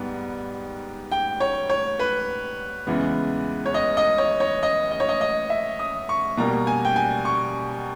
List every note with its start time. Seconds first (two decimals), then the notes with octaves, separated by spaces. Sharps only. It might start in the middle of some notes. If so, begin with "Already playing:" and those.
Already playing: G#2 G3 B3
1.12 G5
1.40 C#5
1.69 C#5
1.99 B4
2.87 E2 C#3 E3 G#3 B3
3.65 C#5
3.74 D#5
3.97 D#5
4.18 C#5
4.40 C#5
4.63 D#5
4.91 D#5
5.00 C#5
5.09 D#5
5.21 D#5
5.50 E5
5.79 D#6
6.09 C#6
6.37 B2 G3 A#3 A#5
6.67 G#5
6.85 G5
6.96 G#5
7.25 C#6